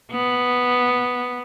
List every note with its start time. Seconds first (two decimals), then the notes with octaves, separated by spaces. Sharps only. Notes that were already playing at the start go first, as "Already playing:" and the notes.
0.12 B3